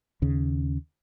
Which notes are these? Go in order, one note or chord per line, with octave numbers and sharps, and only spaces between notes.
D#2 C#3